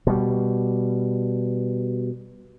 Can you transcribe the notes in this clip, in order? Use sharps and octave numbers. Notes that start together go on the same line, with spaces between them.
B2 G3